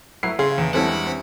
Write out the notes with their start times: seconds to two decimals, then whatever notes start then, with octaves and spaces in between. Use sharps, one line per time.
0.23 F#3 G#3 A3 E4 B4 F#5 C7
0.39 C#3 G#4 F5 C6
0.58 E2
0.73 G2 G#3 C4 C#4 E4 A4 F#5 B5
0.88 G#3
1.06 C4